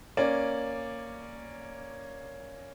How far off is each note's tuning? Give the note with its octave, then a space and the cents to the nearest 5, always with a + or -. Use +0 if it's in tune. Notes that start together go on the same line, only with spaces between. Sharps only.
A#3 +0 C#4 +0 D5 +0